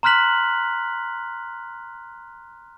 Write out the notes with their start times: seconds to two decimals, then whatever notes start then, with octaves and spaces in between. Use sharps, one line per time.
0.03 A#5 C6 F6 F#6 B6 F#7